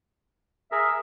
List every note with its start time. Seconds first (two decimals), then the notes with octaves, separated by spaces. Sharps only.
0.72 G#4 A#4 E5